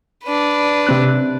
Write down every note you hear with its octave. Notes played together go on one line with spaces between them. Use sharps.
D4 B4
C3 C4 F#6